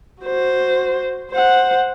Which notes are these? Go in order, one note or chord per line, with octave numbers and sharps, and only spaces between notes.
F#4 C5
C5 F#5